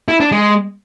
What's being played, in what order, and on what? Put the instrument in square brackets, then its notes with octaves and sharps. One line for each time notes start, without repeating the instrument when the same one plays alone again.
[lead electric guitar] E4
D4
G#3